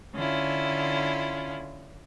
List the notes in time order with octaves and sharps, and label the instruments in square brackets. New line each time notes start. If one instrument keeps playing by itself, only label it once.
[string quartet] D3 C#4 E4 F4